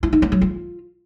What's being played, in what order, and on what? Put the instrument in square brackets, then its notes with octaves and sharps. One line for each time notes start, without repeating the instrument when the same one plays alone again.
[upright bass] E4
D#4
B3
F#3
F4